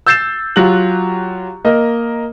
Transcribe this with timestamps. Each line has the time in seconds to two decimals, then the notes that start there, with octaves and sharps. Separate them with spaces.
0.07 E6 G6 A6 C7 E7
0.56 F#3 F4 G4 F#6 F#7
1.65 A#3 A#4 D#5